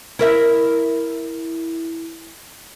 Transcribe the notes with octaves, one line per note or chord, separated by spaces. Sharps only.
E4 A#4 E5